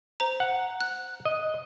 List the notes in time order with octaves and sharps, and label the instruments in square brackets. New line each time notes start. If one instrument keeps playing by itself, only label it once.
[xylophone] C5 A#5
[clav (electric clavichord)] F#5
[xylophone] F#6
[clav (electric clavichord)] D#5